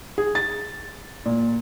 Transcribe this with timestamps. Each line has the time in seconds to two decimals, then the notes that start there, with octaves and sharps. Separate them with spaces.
0.18 G#4
0.35 A6
1.26 A#2